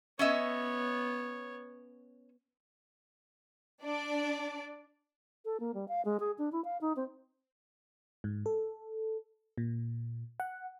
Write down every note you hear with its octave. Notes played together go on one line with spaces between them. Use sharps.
B3 C#4 C#5 D#5 E5
D4 D5
A4
A#3
G3
F5
G#3
G#4
D4
E4
F5
D#4
C4
G#2
A4
A#2
F#5